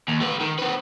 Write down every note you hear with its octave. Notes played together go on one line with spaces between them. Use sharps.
D#2
A3 B4
D#3
C4 B4